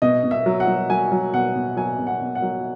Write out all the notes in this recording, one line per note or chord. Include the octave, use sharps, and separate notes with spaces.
B2 D#5
B2
E5
F#3
F#5
F#3
F#3 G#5
F#3
B2 F#5
B2
F#3 G#5
B2
F#5
B2
F#5
F#3